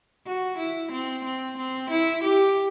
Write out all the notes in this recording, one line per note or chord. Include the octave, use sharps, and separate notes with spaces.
F#4
E4
C4
C4
C4
E4
G4